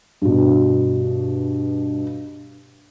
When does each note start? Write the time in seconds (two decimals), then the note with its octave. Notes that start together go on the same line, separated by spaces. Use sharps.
0.22 G2 B2